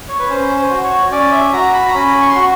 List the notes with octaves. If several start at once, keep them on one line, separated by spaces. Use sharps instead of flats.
C#5
B4
C#4 C5
C5
F#4
C#5
C#4 D5
E5
F#4 A#5
B5
A#5
C#4 B5
C#6
C6
F#4 C#6